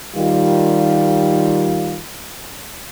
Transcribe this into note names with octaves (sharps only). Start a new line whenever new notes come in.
D#3 G3 F4